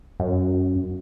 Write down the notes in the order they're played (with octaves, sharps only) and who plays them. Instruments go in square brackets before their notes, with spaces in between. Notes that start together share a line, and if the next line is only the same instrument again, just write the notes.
[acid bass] F#2